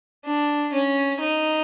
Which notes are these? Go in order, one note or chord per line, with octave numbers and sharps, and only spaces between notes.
D4
C#4
D#4